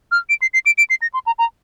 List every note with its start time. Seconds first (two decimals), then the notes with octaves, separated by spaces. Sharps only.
0.12 F6
0.29 D7
0.42 C7
0.54 C7
0.66 D7
0.78 D7
0.90 C7
1.02 A#6
1.14 C6
1.26 A#5
1.39 A#5